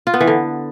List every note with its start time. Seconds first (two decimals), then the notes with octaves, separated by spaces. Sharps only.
0.07 F4
0.14 B3
0.21 E3
0.27 D3